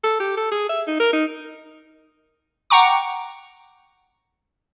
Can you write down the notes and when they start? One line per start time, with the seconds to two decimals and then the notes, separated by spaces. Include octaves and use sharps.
0.04 A4
0.20 G4
0.37 A4
0.51 G#4
0.69 E5
0.87 D#4
1.00 A#4
1.13 D#4
2.70 F#5 G5 A#5 C#6 D6